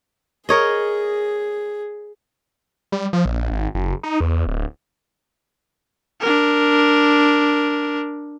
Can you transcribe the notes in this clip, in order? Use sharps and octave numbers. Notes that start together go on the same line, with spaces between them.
G#4 A#4 C#5 D#5
G3
F3
A#1
G#1
F#1
D#4
E2
D1
D4 A#4